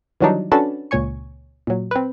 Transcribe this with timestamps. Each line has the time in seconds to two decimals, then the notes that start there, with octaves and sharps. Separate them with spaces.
0.21 D#3 E3 F#3 G3 D4 D#4
0.52 C#4 D4 F#4 A4 B4 A5
0.91 C#2 A#2 C#5 G#5 C#6
1.67 A#2 F#3
1.91 C4 B4